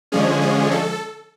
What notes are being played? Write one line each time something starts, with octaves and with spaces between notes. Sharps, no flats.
D3 F3 G#3 C#4 G#4
G#4
A4